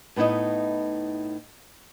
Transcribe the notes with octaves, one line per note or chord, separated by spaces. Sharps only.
A2 B3 D#4 E4 D#5